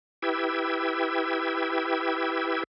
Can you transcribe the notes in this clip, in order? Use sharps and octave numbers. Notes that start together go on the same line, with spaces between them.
E4 G4 B4 G5 E6 G#6